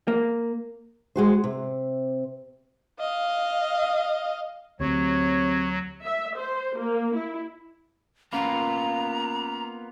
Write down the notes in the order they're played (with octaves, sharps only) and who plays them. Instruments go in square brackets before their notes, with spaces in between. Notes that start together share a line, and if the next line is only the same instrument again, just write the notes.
[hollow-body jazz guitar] A#3
[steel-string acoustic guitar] G#3 F#4 C5
C3
[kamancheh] D#5 F5
[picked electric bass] D2 [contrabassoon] C3 [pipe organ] F#3 [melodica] C#5
[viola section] E5
C5
A#3
E4
[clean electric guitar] A#3 B3 F4 [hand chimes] C#4 F5 B5 [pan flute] A#5